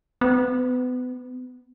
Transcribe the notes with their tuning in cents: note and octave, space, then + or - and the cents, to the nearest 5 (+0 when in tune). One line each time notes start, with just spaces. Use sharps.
B3 +30